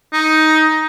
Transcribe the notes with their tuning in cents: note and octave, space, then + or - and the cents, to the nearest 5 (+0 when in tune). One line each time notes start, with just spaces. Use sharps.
D#4 +10